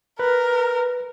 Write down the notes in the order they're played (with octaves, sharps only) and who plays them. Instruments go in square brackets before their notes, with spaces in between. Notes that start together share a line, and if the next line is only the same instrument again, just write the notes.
[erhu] A#4 [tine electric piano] B4